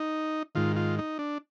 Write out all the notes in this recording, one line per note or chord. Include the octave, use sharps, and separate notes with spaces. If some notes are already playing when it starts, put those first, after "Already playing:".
Already playing: D#4
G#2 D#3 F4
F4
D#4
D4